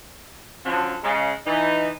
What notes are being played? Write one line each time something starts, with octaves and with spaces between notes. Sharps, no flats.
D3 F3 F#3 C#4 D4
C#3 G#3
E3 D#4